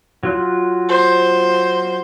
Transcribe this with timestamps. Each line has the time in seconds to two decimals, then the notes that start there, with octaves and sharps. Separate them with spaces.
0.23 F#3 F4 F#6
0.89 C5